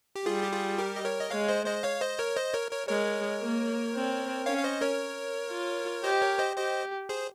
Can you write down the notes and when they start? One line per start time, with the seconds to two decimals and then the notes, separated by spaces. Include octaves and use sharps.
0.15 G4
0.26 G3 F4 G#4
0.43 G4
0.52 F4 G#4
0.78 G4 A#4
0.96 D#5
1.05 A#4 C#5
1.20 D#5
1.31 G#3 C#5 F5
1.48 C5 D#5
1.66 C5 D#5
1.83 C#5 F5
2.01 C5 D#5
2.19 A#4 C#5
2.36 C5 D#5
2.54 A#4 C#5
2.71 A#4 C#5
2.88 G#3 A#4 C#5
3.41 A#3
3.94 C4
4.46 C#4 C#5 F5
4.57 F5
4.64 C5 D#5
4.81 A#4 C#5
5.51 F4
6.04 G4 C5 D#5
6.21 A#4 C#5
6.38 C5 D#5
6.56 G4 C5 D#5
7.09 G#4 C5